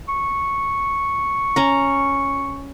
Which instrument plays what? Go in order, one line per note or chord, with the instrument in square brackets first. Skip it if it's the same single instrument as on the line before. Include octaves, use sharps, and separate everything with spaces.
[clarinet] C#6
[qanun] C#4 A#5